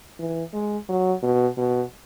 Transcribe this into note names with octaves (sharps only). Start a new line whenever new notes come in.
E3
G#3
F#3
B2
B2